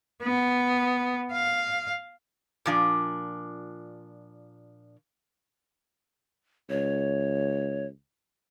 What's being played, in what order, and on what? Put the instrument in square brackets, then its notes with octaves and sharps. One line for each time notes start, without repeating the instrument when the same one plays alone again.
[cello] B3
F5
[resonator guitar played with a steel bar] A#2 F3 D4
[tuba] C#2 [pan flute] C#5